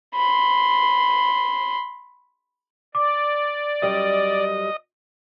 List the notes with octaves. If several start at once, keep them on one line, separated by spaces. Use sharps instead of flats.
B5 C6
D5 D6
F#2 G3 D#5